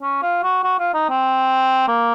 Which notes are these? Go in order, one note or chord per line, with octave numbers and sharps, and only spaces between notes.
C#4
F4
F#4
F#4
F4
D#4
C4
A#3